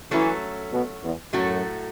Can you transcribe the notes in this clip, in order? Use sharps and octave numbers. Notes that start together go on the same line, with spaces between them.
E3 F#3 A3 C#4 A4
B2
E2
F#2 A2 F#3 A3 F#4 A4